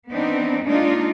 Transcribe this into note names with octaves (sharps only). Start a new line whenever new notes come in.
E3 B3 C4 D4 D#4
G#3 A#3 D4 D#4 F4